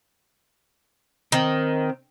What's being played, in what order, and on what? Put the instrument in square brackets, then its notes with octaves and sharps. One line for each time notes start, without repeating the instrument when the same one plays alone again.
[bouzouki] D#3 [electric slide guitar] C4